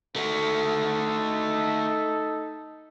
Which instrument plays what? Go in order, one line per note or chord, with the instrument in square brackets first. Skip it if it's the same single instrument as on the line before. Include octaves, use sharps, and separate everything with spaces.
[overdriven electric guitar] A3 F#4 [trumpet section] D#4 A4